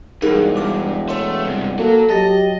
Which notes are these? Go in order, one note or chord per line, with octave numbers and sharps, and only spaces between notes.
E1 G2 D#4 G#4 A#4
G2 D6
A3 C#5 C6
G2 C3
F#3 A#3 A4
F#3 G4 D#5 A5 A6 A#6